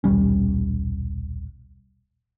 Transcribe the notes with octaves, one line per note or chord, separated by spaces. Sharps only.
D#1 B1 G3 C#4